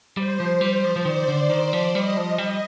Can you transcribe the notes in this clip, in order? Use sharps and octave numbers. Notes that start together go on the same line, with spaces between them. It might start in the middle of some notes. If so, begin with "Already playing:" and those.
G3 C5
F3
G3
F3
F3
D#3 D5
D3
D#3
F3
G3 D#5
F3
G3